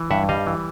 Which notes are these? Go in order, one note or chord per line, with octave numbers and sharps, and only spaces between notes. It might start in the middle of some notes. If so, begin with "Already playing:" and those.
Already playing: E3
G2 E5 F#5
G3 D#5 F5
E3